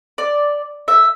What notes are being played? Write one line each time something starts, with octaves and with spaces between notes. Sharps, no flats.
D5
E5